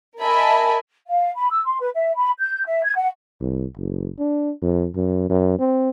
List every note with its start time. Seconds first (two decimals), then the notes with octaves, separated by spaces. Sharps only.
0.21 A#4 D#5 E5 G#5 A5 B5
1.08 F5
1.35 B5
1.50 E6
1.65 C6
1.79 B4
1.94 E5
2.16 B5
2.40 G6
2.65 E5
2.84 G#6
2.95 F#5
3.41 C2
3.77 F#1
4.18 D4
4.62 F2
4.95 F#2
5.29 F#2
5.59 C4